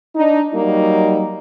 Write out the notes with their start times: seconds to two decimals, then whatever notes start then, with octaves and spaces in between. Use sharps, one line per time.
0.16 D4 D#4
0.53 F#3 G3 A#3 D#4